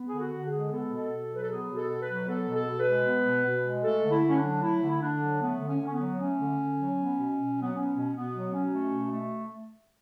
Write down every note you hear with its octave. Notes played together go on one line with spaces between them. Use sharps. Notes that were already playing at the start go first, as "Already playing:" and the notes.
Already playing: B3
D3 G#4
F#4
D3
G#4
G#3
B3 A4
B2
B2
F#3 B4
A4
B3 G#4
B2
A4
B2
B4
F#3
B3 A4
B2
A4
B2
B4
G#3
B3
B2
B2
G#3
A3 A4
D3
E4
D3
C#4
D4
F#3
A3 E4
D3
E4
D3 D4
F#3
A3 B3
D3
C#4
D3
C#4
B3
F#3
A3 C#4
D3
D3
F#3
B3
B2
B2
F#3
B3
B3 C#4
B2
B2 B3
F#3
B2 C#4
A3
B2
A3